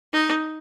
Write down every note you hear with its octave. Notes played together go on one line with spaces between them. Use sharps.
D#4